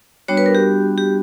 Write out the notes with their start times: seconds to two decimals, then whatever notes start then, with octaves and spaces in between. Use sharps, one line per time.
0.28 G3 B3 D4 F#4 C#5
0.37 B4
0.46 A#4
0.55 G4
0.98 G4